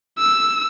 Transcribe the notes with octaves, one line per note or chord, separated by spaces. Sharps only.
E6